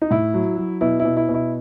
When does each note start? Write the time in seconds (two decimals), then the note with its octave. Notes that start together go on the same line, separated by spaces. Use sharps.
0.02 D#4
0.11 A2 E4
0.34 F#3
0.57 F#3
0.81 B2 E4
1.00 E4
1.05 B2
1.17 E4
1.29 B2
1.34 E4